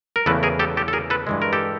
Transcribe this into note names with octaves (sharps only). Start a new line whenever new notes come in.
A#4
E2 C#3 E3 A3 A4 B4
G#4 A#4
G4 A4
G4 A4
A4
G#4 A#4
A4 B4
G2 E3 G#3
A#4
G4 A4